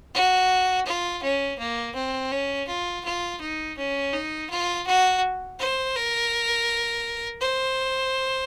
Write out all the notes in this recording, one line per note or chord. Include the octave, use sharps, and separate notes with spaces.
F#4
F4
C#4
A#3
C4
C#4
F4
F4
D#4
C#4
D#4
F4
F#4
C5
A#4
C5